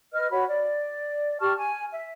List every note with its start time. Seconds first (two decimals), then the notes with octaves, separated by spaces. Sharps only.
0.12 B4 D#5 F6
0.31 F#4 C#5 B5
0.47 D5
1.40 G4 A5 C#6 F6
1.58 G#5
1.92 E5